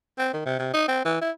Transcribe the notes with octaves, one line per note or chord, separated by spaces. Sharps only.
C4
D#3
C3
C3
D#4
C4
E3
E4